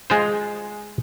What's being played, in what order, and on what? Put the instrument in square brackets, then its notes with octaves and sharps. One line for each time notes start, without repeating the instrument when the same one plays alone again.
[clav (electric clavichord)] G#3 F4 C5